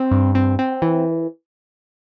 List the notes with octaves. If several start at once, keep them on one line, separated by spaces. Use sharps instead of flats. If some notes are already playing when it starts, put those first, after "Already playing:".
Already playing: C4
G2
C4
C4
E3